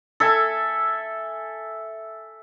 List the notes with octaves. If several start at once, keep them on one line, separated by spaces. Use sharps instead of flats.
A4 E5 G#5